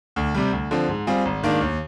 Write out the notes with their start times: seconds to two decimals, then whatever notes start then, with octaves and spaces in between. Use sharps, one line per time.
0.16 D2
0.34 C3 G3
0.52 D2
0.71 D3 F3 C4
0.88 G#2
1.07 G3 C4 F4 G#4
1.25 G#1
1.43 G#2 D#3 A#3 D4
1.61 D#2